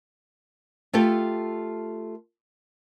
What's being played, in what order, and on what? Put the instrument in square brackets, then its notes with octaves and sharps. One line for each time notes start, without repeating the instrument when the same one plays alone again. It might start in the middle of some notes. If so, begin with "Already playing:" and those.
[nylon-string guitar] A3 F4 G4 A4